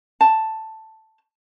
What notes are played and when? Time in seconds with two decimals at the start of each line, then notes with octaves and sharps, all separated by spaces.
0.21 A5